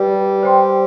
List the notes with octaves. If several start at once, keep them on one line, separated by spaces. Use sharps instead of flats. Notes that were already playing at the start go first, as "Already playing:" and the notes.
Already playing: G3 G4 B4 D5
C5 G5 C6